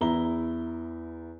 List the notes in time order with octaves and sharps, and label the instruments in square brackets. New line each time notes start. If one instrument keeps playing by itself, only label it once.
[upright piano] E2 E4 A#5 G7